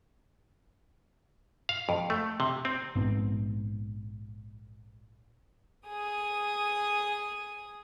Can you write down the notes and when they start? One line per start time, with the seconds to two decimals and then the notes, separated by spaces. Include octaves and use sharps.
1.69 F5
1.89 F2
2.10 A3
2.40 C3
2.65 C4
2.96 A#1 G#2 B3 C4
5.87 G#4 D#6